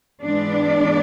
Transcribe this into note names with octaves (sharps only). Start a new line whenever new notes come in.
G#2 E3 G#3 B3 D4 D5